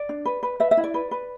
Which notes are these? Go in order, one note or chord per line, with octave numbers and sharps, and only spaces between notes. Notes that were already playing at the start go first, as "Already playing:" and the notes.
Already playing: D5
D4
B4
B4
B4 E5
E5
E4
D5
B4
B4